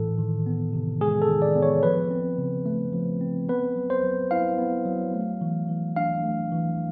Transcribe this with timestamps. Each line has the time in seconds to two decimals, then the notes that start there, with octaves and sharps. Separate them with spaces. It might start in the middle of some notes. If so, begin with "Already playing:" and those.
Already playing: A2 E3 A4
0.18 D#3
0.46 B3
0.73 C3
1.01 G#3 G#4
1.22 A4
1.29 D#3
1.42 D5
1.56 B3
1.62 C#5
1.83 F3 B4
2.11 C4
2.38 C#3
2.66 A3
2.93 F3
3.21 C4
3.49 B3 B4
3.76 F#3
3.90 C5
4.04 F#3
4.31 E4 F5
4.59 B3
4.86 F#3
5.14 A3
5.41 E3
5.69 E3
5.96 D4 F5
6.23 A3
6.52 E3